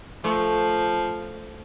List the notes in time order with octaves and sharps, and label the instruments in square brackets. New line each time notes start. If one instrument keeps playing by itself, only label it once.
[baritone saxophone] F3 [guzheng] A3